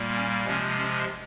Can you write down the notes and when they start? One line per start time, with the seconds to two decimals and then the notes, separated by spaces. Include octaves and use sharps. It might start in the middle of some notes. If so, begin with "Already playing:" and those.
Already playing: A#2 G3 A#3
0.16 C#4
0.46 C3 F3 G#3 C#4
0.77 C#4